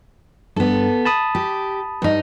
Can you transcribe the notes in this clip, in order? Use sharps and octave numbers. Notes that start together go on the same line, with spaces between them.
G2 B3 A4
A5 B5 D#6
G4
G2 D#4